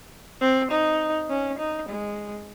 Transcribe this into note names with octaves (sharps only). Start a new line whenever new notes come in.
C4
D#4
C#4
D#4
G#3